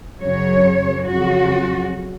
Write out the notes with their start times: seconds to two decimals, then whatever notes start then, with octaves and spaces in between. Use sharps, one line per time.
0.20 F#2 C#3 F#3 C#5
1.04 F2 C#3 F#3 F#4